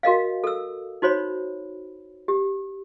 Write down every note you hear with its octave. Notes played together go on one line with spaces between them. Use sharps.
F#4 A#4 D#5 F5
A4 E6
D#4 F#4 C5 C#5 B5
G4